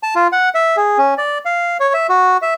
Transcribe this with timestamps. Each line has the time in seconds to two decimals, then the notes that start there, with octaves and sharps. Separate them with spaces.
0.03 A5
0.15 F4
0.32 F#5
0.55 E5
0.77 G#4
0.98 C#4
1.18 D5
1.45 F5
1.80 C#5
1.94 E5
2.09 F#4
2.42 E5